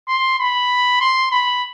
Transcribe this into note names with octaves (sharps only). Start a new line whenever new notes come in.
C6
B5
C6
B5